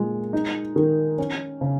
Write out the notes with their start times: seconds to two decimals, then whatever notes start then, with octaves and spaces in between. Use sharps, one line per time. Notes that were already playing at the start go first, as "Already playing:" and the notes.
Already playing: A#2 G#3
0.33 D#4
0.76 D#3
1.18 C#4
1.61 C#3